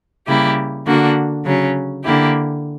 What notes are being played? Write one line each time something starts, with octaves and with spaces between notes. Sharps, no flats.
C#3 G3 A#3 E4 G4
D3 A#3 D4 F#4
C#3 F#3 C#4
D3 A#3 E4 G4